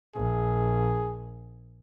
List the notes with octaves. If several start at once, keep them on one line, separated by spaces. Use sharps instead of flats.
A#1 G#4